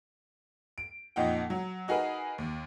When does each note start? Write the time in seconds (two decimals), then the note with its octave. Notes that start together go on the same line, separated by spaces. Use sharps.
0.78 D7
1.16 F2 A#2 D#4 F#5 G5
1.50 F#3
1.88 D#4 F#4 G#4 A#4 B4
2.38 D#2